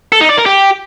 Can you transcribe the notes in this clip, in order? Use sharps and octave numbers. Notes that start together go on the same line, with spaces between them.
A4
D#4
D5
A#4
G4